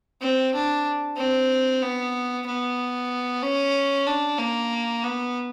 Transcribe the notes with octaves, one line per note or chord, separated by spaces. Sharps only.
C4
D4
C4
B3
B3
C#4
D4
A#3
B3